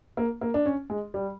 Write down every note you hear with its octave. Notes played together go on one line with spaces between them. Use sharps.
A#3
A#3
D4
C#4
G#3
G3